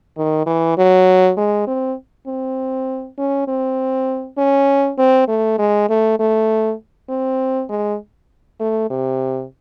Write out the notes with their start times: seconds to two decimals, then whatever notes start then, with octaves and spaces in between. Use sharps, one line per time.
0.17 D#3
0.46 E3
0.78 F#3
1.37 G#3
1.67 C4
2.27 C4
3.18 C#4
3.48 C4
4.38 C#4
4.98 C4
5.28 A3
5.58 G#3
5.89 A3
6.19 A3
7.09 C4
7.69 G#3
8.60 A3
8.90 C3